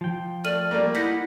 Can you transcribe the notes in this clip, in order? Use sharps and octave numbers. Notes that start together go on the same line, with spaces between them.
F3 G5
A3 D5 F6 D#7 F#7
G3 A3 A#3
D#4 E4 F#5 G6 A#6 B6